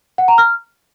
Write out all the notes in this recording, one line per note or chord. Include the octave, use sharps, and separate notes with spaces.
F#5
A#5
F6